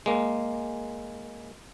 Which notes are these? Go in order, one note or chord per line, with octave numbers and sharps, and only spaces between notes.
G#3 A#3